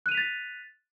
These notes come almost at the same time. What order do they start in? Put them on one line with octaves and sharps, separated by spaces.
F#6 D#7 F7 B6 A6